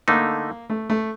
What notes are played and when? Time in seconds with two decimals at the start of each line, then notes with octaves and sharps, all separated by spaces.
0.08 D3 A3 A#3 D#4
0.70 A3
0.90 A3